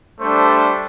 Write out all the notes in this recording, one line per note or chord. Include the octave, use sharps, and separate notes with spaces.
G3 A3 D4 C5